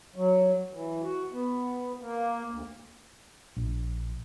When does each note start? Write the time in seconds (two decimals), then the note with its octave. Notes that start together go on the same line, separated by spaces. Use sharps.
0.16 F#3
0.73 E3
1.03 F#4
1.33 B3
2.01 A#3
2.51 D2
3.57 A#1